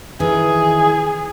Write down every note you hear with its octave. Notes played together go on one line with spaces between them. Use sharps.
D#3 E3 G#4